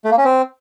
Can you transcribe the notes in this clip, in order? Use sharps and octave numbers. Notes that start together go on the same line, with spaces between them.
A3
A#3
C#4
C4